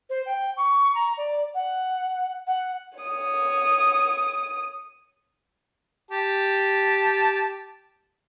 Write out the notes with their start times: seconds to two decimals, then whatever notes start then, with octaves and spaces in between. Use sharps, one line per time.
0.10 C5
0.26 G5
0.57 C#6
0.95 A#5
1.18 D5
1.54 F#5
2.47 F#5
2.98 C#5 D#6
6.11 G4 A5